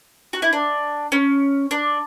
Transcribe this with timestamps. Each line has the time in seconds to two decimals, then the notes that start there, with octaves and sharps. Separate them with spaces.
0.33 F#4
0.42 E4
0.53 D4
1.12 C#4
1.71 D4